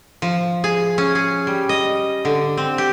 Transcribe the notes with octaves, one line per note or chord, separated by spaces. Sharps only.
F3
G#4
C#4
G#4
G3
D#5
D3
C4
G4